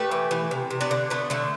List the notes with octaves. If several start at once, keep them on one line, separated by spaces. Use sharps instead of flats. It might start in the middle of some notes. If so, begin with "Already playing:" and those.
Already playing: A3 G4 B4
E3
E3
C3
C3
B3 D4
D3
A3 B3
D3 A3